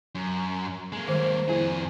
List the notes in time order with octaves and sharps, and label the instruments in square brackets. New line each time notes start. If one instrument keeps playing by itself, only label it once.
[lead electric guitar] F#2
G#3 A#3
[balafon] D#3 G3 [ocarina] C5
[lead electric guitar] F2 G#4 [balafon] E4